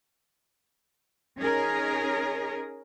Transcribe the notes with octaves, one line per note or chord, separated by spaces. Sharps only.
C#4 D#4 G#4 A#4